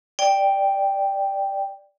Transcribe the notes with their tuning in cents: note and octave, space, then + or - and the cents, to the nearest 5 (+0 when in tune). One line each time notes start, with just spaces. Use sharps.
D5 +0 G5 +0